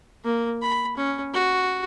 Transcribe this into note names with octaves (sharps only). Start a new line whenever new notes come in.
A#3
B5
C#4
F#4